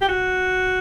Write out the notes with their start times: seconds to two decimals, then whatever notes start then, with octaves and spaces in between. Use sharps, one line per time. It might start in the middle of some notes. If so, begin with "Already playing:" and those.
0.02 G4
0.09 F#4